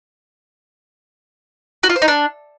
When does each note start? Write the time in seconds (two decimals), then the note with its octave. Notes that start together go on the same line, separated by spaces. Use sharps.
1.83 F#4
1.89 F4
1.96 C5
2.02 D#4
2.08 D4